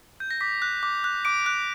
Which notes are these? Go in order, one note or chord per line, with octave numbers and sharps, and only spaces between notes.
G6
A#6
D6 B6
F#6
D6
F#6
D6 D7
F#6